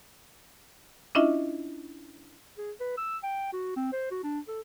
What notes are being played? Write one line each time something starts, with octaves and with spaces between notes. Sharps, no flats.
C#4 D4 E4 F4 D#5 E5
G#4
B4
E6
G5
F#4
C4
C5
F#4
D4
A4